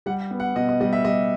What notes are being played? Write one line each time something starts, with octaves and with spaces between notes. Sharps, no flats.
G3 F#5
B3
F#5
B2 D#5
D#5
G3 D#5
E5
G3 D#5